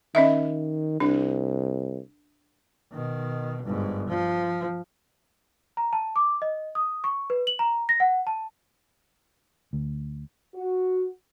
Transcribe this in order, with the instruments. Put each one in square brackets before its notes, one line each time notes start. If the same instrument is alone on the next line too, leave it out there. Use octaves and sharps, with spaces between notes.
[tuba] D#3 [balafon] C#4 D#5 E5
[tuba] C2 [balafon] D4
[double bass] B2 D#3
G1 G#2
F3
[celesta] A#5
A5
D6
D#5
D#6
C#6
B4
F#7
A#5
A#6
F#5
A5
[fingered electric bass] D2
[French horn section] F#4